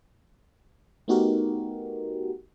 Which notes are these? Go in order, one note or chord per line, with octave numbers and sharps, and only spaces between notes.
A3 B3 D#4 F#4 G4 A#4